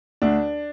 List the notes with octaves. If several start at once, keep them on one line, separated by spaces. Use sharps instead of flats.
D2 D4